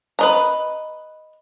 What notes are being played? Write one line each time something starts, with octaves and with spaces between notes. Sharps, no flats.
B4 D#5 A#5